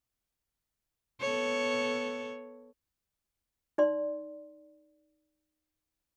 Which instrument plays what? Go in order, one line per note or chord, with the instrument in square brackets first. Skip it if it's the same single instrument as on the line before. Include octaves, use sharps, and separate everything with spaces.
[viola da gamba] B3 A4 C#5
[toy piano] D#4 D5 C6